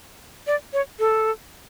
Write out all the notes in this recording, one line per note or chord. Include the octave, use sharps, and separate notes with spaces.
D5
C#5
A4